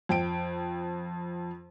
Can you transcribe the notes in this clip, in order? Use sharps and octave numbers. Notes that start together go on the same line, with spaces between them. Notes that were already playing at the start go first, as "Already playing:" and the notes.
F2 G5 D7